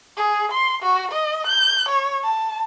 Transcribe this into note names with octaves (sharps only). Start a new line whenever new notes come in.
G#4
C6
F#4
D#5
G6
C#5
A5